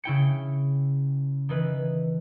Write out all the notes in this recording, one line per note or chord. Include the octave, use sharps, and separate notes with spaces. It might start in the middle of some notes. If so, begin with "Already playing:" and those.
C#3 E4 G5 C#7
D#3 E3 B4